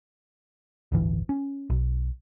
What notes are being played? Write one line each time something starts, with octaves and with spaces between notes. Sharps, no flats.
D1 G1 E3
C#4
B1